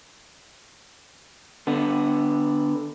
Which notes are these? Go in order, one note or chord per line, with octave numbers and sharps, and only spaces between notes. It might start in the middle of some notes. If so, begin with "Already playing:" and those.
D3 B3